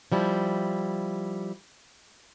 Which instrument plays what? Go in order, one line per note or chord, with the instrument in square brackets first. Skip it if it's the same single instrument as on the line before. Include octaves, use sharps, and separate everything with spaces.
[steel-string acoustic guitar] F3 G3 E4